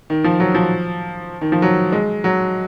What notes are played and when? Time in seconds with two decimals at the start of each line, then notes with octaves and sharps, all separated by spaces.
0.10 D#3
0.24 F3
0.40 F#3
0.55 F3
1.41 D#3
1.52 F3
1.62 F#3
1.92 G#3
2.24 F#3